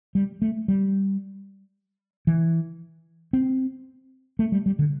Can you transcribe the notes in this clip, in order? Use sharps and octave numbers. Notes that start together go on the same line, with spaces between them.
G3
A3
G3
E3
C4
A3
G3
G3
D3